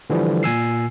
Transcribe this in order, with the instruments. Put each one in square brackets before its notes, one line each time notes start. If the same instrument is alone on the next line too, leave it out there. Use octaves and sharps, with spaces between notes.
[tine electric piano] D3 E3 F3 G3
A#2 G#5 E6 C7